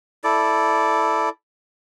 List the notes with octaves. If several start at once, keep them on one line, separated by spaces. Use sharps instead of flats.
E4 A4 D5